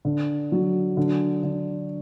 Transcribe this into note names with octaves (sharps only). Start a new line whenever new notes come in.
D3
F#3
D3
D3